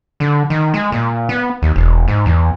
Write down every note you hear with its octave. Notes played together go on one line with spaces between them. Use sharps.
D3
D#3
G#3
A#2
B3
D#2
E1
G#2
E2